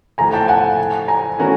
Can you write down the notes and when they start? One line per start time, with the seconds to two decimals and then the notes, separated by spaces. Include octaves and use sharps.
0.18 A2 F3 A3 G#5 A#5
0.33 G5 A5
0.48 F#5 G#5
1.08 G#5 A#5
1.38 E3 A3 C#4 F#4 A#4